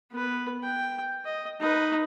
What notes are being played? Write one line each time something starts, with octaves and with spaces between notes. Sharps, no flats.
B3 B4
G5
D#5
D#4 B4